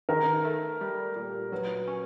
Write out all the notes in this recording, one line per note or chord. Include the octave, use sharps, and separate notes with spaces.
D#3 A#4
A3
G3
A#2
F#3 B4
C#4